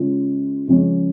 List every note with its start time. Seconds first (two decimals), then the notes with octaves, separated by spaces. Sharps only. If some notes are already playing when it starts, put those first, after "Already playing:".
Already playing: C#3 G#3 C#4 F4
0.68 C#3 F3 G#3 C#4